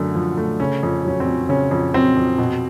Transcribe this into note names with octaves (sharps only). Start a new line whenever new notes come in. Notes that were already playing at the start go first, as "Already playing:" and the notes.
Already playing: F#2 D3 A3
F3
A3
C#3 C#4
F2
F#3 C#4
C4
F2
C#3 C#4
F2
F#3 C4
F2
B2